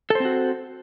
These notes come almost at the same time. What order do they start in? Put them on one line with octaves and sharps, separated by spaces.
A4 C5 C4 F#4